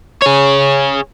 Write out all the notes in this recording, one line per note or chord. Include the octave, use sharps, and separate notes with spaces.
G#4 C#5